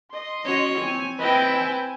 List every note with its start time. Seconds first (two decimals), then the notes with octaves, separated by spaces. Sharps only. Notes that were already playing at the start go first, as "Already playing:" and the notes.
0.12 D#5 C6
0.45 C#4 F#4 C#5
0.79 C4 G#5
1.19 C4 E4 B4 D#5 G5
1.54 G#5